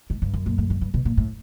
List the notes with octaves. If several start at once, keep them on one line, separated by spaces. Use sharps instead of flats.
G#2
G2
F#2
A#2
A2
G#2
G2
B2
A#2
A2